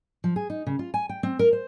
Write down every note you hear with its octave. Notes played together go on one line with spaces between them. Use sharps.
F3
G#4
D#4
C#3
F4
G#5
G5
C4
A#4
C5